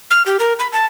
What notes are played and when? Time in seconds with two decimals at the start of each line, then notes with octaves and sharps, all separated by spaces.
0.11 F6
0.26 G4
0.39 A#4
0.59 B5
0.72 A5